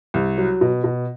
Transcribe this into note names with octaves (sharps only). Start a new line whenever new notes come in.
C2
F#3
B2
B2